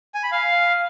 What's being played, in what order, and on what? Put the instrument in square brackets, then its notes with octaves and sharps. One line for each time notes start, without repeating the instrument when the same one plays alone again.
[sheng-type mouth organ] G#5
B5
F5